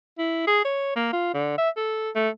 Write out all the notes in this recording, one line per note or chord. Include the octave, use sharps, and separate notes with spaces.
E4
G#4
C#5
A#3
F4
D3
E5
A4
A3